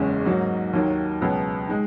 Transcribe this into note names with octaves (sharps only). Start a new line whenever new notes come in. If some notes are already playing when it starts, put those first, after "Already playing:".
Already playing: F#1 E2 C#3 G#3 C#4
G#2 F#3 A#3 D#4 F#4
D#2 D#3 F#3 A#3
C#2 B2 F#3 B3
G#3 D#4